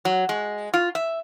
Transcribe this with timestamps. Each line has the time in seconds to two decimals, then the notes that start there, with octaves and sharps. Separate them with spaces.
0.05 F#3
0.29 G#3
0.74 F4
0.95 E5